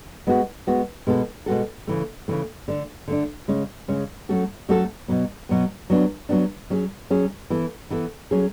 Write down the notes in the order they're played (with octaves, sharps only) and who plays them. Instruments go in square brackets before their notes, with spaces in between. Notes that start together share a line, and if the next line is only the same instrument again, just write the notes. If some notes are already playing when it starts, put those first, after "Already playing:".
[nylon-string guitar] G#3 B3 F#4
G#3 B3 F#4
B2 G#3 B3 F#4 A4
B2 G#3 B3 F#4 A4
C#3 E3 A3
C#3 E3 A3
D3 A3 D4
D3 A3 D4
C#3 G#3 C#4
C#3 G#3 C#4
F#3 A3 C#4 F#4 A4
F#3 A3 C#4 F#4 A4
B2 F#3 B3
B2 F#3 B3
F#3 B3 D4
F#3 B3 D4
F#3 C#4 G#4
F#3 C#4 G#4
E3 B3 E4 A4
E3 B3 E4 A4
F#3 A3 C#4 G#4